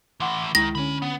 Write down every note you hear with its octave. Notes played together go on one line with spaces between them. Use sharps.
A2 E3 F#5 C6 D6
C#2 D#3 G#3 E4 A#6
D3 C#4 C#5 B5
B3